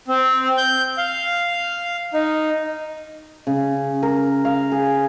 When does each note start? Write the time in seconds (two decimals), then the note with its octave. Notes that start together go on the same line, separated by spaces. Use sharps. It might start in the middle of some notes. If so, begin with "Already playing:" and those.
0.08 C4
0.57 G6
0.98 F5
2.14 D#4
3.47 C#3
4.03 A#4
4.45 F5
4.72 G#4